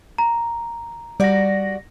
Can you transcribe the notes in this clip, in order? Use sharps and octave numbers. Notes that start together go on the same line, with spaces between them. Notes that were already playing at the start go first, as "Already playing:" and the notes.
A#5
G3 F#4 D5 A#6